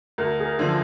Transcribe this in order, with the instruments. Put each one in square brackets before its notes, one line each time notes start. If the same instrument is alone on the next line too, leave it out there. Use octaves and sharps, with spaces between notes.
[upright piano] D2 [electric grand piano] A#4
[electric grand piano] G#4
A#4
[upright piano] D3 F3